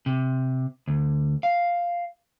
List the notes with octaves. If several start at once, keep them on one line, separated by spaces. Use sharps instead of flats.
C3
D2
F5